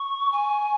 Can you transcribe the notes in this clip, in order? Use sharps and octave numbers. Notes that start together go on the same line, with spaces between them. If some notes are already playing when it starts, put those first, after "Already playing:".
Already playing: C#6
G#5